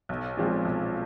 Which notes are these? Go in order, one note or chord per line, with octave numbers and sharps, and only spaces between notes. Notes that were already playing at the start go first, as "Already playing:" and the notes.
B1
A#2 F3 G#3 C4
B1